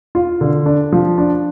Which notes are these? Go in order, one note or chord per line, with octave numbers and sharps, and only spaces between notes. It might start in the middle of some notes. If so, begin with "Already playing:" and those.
F4
D3
D4
F3
D4